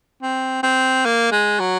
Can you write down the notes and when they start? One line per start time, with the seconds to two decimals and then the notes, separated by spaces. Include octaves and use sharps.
0.22 C4
0.63 C4
1.05 A#3
1.32 G#3
1.60 F#3